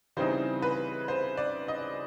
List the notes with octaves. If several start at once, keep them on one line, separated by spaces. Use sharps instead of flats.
C#3 E3 G3 C4 D#4 C5
B4
C5
D5
D#5